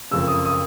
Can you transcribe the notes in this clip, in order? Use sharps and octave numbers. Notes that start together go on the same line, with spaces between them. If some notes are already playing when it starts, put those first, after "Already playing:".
F#1 F2 C#3 E6
D#6
D#6